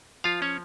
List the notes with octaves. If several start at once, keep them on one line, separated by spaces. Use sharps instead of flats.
F3 F4 F5
C#4 C#5